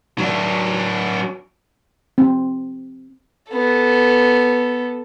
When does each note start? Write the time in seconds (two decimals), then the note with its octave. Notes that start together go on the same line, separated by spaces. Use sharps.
0.18 F#3 D4
2.18 C4
3.52 B3 A4